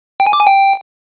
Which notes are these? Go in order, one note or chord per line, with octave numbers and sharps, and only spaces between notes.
G5
G#5
D6
G#5
G5